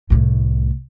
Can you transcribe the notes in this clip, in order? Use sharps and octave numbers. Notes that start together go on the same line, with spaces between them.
C2 A2